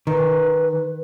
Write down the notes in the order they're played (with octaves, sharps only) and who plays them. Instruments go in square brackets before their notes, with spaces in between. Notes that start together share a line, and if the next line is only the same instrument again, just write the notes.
[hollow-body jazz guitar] D#3 [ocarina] B4